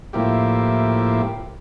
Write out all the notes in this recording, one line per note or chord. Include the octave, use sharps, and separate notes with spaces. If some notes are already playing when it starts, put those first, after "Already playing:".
A2 F3 A#3 E4 G4